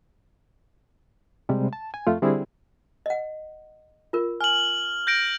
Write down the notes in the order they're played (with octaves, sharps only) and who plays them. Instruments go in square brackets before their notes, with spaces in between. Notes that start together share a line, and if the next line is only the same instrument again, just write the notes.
[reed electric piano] C3 G3 G#3
A5
G#5
F2 A3 F4
D3 G3 C4 D4 E4 G#4
[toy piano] D#5 F#5
F4 A#4
[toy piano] G#5 [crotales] F6 F#7
[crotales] G6 A#6 D7